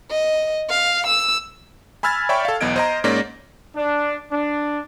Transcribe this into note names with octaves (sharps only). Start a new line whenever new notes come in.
D#5
F5
E6
G#5 B5 E6 F6 G#6 A6
C#5 D5 E5 G5 B5 C#6
A4 F5
B1 E2 B3 D#5 G#6 D7
C5 D#5 A#5
G#2 A#3 C#4 D5 A#6
D4
D4